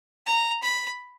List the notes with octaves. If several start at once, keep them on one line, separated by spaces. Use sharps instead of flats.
A#5
B5